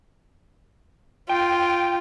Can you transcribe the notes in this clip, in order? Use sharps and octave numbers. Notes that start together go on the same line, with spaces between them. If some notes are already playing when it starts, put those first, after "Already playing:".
F4 G5